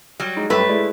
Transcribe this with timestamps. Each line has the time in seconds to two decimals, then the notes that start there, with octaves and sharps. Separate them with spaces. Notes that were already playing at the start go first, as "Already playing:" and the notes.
0.20 F#3 G3
0.37 G#3 D#4
0.50 F#2 G3 A3 G4 B4
0.69 G#3 E4 D5